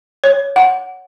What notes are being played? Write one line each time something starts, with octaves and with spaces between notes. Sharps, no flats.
C#5
F#5